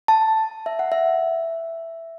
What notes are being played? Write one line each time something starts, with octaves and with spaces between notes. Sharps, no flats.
A5
E5
F#5
E5